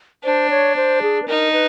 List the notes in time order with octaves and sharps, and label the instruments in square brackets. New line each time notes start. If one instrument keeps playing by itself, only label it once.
[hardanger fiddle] D4 [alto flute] C5
[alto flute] C#5
C5
G#4
B4
[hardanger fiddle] D#4 [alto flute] A#4
[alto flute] B4